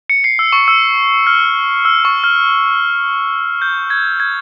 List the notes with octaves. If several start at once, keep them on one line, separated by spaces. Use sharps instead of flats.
C#7
C7
E6
C#6
E6
F6
E6
C#6
F6
G6
G#6
G#6